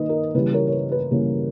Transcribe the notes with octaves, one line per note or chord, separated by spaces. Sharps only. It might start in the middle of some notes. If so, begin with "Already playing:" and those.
Already playing: D#3 A#3 B4 D#5
A#4
C#3 E3 G3 A#3 B4
A#4 C#5
C#5
B4
B4
C#3 E3 G3 A#3